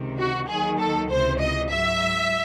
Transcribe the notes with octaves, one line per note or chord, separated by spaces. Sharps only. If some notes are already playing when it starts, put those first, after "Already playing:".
Already playing: C#2 C3 D#3
F#4
D#2 D#3 F#3 G#4
A4
C#2 C3 E3 C5
D#5
G#2 F#3 E5